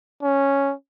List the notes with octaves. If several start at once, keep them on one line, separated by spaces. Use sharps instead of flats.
C#4